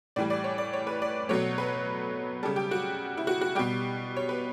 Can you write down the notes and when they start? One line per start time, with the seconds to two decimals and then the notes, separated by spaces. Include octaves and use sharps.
0.16 A2 E3 G3 D5
0.30 D5
0.44 C#5
0.58 D5
0.73 C#5
0.87 B4
1.02 D5
1.29 B2 F#3 A3 C#5
1.58 B4
2.43 C#3 G3 A4
2.56 G4
2.71 F#4
3.17 E4
3.27 F#4
3.41 F#4
3.55 G3 G4
3.59 B2
4.16 C#5
4.29 B4